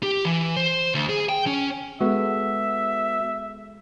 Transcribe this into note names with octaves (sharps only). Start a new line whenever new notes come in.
G4
E3
C5
D2
G#4
G5
C#4
G#3 B3 F#4 A4 E5